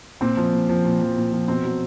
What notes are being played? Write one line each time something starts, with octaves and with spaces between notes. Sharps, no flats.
A#2 C4
F3
A#2
F3
A#2
F3
A#2
F3
B2 C4
F#3